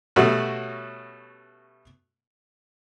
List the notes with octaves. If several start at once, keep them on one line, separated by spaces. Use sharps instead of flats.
B2 G3 A3 C#4 F#4